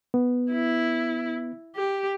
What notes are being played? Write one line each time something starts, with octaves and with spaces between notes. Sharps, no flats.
B3
E4
G4